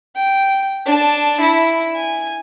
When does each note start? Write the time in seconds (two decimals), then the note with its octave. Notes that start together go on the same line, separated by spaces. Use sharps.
0.16 G5
0.86 D4 A5
1.40 E4
1.96 G#5